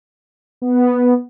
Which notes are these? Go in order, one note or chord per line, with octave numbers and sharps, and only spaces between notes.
B3